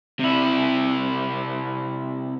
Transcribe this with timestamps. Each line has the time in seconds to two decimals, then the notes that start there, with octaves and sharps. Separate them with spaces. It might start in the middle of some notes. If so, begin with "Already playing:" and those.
0.19 C3 E4